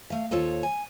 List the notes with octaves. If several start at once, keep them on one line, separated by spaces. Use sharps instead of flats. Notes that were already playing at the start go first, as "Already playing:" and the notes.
A3 F5
D#2 F4 A4 C5 C#5
G#5